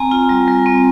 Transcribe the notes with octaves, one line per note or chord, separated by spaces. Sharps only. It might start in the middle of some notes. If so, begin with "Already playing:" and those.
Already playing: C4 G#5 A#5
F4
G3
G3
C4